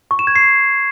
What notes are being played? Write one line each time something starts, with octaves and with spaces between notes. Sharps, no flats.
C#6
E7
G#6
C7